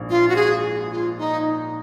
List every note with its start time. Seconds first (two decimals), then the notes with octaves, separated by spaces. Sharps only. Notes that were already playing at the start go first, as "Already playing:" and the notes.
Already playing: A#1 G#2
0.10 F4
0.29 F#4
0.36 G#4
0.91 F4
1.18 D#4